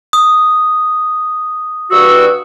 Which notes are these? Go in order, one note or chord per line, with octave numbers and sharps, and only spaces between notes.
D#6
G2 F#4 E6